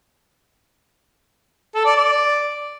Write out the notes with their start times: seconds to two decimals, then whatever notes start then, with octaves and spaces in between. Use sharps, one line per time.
1.75 A4
1.85 D5
1.96 D5